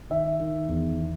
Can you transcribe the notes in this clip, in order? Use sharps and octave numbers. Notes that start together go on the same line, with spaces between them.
D#3 E5
D#3
E2